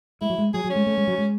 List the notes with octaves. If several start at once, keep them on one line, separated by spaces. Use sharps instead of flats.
G#3 E4
F#3
G#3
F#3 G#4
F#3
C#4
G#3
A3
G#3
F#3
G#3